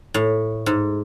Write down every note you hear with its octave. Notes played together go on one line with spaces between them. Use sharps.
A2
G#2